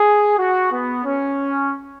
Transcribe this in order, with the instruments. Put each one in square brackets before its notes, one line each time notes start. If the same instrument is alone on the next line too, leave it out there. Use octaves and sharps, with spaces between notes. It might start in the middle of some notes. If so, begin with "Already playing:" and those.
Already playing: [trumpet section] G#4
F#4
B3
C#4